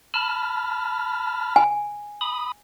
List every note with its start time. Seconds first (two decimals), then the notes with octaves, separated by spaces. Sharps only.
0.14 A5 B5 F6
1.56 G#5
2.21 B5 D#6